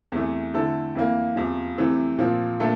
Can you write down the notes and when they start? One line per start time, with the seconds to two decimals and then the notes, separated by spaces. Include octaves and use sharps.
0.12 E2 C3 E3 A3
0.53 D3 A3 C4 E4 A4
0.95 F2 E3 A#3
1.36 E2 C3 F3
1.78 C3 E3 A3 C4
2.18 A#2 F3 C4
2.60 A#2 A3 D4 A4